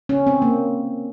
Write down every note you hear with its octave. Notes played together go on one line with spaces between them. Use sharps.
C#4
C4
A#3